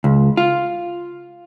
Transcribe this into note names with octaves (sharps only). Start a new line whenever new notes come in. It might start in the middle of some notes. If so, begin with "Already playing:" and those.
C#2
F4